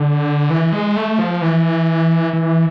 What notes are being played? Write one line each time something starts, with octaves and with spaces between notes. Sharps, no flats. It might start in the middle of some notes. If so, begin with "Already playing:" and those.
Already playing: D3
E3
G#3
A3
F3
E3
E3